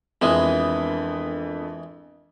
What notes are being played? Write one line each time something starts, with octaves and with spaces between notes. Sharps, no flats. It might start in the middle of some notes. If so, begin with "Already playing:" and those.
F2 E3 G#3 B3 D4 A#4 D#6